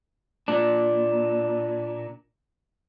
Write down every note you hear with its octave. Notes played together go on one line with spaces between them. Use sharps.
A#2 D4